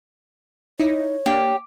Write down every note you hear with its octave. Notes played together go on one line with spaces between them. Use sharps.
D#4 E4 C#5
A#3 D4 G4